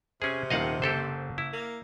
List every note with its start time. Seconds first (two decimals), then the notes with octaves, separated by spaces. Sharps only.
0.22 C3 C#4 G#4
0.50 D#1 D#3 D#5 F5 F#5
0.82 F#1 G4 A4 C5
1.38 E4
1.53 A#3